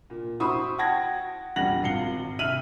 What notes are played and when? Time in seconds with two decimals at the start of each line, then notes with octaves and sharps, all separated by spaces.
0.10 A#2
0.40 E4 F#4 C5 B5 C#6 D#6
0.78 F#5 G5 A5 G#6 A#6
1.56 E1 A#1 G3 F#5 A#6 F#7
1.83 G#1 F4 C7 C#7 G7
2.39 C2 E5 F6 D#7 F#7